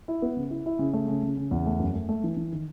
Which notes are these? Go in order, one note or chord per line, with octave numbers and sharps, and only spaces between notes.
E4
B3
C#3
E4
E4
C#3
A3
C#3
C#3
C#3
E2
A3
F#2
A3
A3
E3
E3
D#3